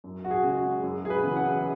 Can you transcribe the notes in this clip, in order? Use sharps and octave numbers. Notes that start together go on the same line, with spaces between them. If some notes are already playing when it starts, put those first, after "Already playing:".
F#2
F#4
G#4
C#3 G#3
F#4
F#2
G#4
B4
C#3 E3 B3
F#5